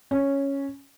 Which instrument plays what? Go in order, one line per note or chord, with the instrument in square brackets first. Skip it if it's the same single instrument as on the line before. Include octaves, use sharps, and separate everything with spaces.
[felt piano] C#4